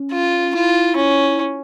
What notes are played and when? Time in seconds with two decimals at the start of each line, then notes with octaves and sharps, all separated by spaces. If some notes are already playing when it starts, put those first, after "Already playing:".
Already playing: C#4
0.12 F4
0.55 E4 F4
0.96 C#4